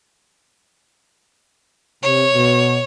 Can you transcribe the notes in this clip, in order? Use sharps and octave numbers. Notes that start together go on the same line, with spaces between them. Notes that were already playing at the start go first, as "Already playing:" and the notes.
C3 C#5
B2